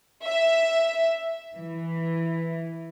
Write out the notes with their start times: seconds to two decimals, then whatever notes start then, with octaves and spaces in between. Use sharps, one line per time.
0.23 E5
1.56 E3